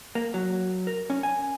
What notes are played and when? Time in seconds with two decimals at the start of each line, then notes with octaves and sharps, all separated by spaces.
0.15 A#3
0.34 F#3
0.87 A#4
1.10 C#4
1.23 G#5